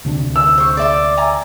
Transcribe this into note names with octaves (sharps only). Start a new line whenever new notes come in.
D2 C3 D4
E6
C5 C#6
D5 E5 C6
D5 G#5 A#5